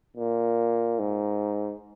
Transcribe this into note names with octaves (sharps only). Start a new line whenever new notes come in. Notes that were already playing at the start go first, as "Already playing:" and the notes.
A#2
G#2